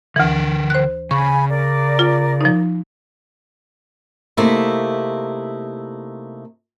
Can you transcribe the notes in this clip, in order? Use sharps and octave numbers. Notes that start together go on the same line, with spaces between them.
D2 D3 E3 A#4
C5 F#6
C#3 G#5 B5 C#6
A#4 D5
F4
F3 D#4
C3 A3 A#3 D#4 E4